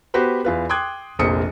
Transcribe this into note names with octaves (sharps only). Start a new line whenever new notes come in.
B3 F#4 G4 B4 C5
E2 F4 B4
G5 C6 D6 D#6 F#6 G#6
F1 A#1 A#3 C5 D#6 C#7